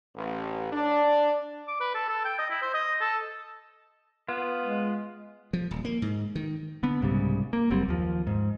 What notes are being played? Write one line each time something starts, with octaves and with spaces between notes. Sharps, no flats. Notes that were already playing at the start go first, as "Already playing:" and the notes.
A1
D4
D6
B4
A4
A4
G5
D#5
E4
C5
D#5
A4
B3 F4
G#3
F3
D#1
A#3
G#2
D#3
D3 B3
C2 G#2 C#3 G3
A#3
F#1 F#3 G3 C4
D#2 F3
G#2